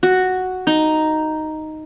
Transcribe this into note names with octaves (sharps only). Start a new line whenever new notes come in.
F#4
D#4